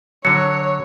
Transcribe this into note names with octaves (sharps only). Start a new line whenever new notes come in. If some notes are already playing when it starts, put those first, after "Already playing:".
D3 F#3 C#5 C#7